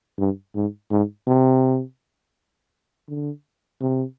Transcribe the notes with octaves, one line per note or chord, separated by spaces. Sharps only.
G2
G#2
G#2
C3
D3
C3